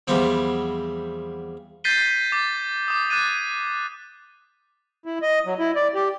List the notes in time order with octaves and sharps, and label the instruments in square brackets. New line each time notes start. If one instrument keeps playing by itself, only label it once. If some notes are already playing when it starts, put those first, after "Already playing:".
[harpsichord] E2 F3 G3 B3 C4
[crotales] G6 A6 B6 C7 D#7 G7
D6 A6
D6 D#6
D6 D#6 F#6 G#6 A6 D#7
[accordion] E4
D#5
F#3
E4
D5
G4